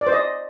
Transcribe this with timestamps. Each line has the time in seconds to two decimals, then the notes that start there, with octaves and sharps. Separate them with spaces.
0.01 D5
0.07 C5
0.12 D#5